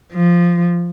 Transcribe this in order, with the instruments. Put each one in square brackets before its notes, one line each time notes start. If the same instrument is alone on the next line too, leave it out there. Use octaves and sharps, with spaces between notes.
[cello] F3